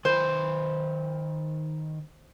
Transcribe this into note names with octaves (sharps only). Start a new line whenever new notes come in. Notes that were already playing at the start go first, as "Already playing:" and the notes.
D#3 B4 C5